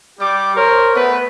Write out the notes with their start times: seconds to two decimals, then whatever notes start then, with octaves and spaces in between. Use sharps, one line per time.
0.19 G3 G4 D6
0.55 A#4 C5 C#5
0.94 A3 B3 B4